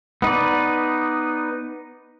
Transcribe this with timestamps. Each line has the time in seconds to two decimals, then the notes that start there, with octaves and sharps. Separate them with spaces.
0.22 B3 D#4 B4 D5